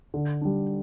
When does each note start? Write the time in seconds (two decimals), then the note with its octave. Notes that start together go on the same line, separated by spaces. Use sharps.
0.14 D3
0.41 G3 D4